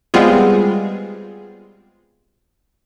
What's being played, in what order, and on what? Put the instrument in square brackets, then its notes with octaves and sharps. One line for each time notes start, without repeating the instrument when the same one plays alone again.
[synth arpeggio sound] G3 G#3 B3 C4 F4 G#4